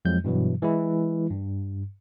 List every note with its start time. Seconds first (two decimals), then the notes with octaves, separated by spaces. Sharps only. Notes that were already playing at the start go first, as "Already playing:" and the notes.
0.05 F2 F3 F#3 G#3 G6
0.24 G2 B2 E3 F#3
0.62 E3 G#3 E4
1.31 G2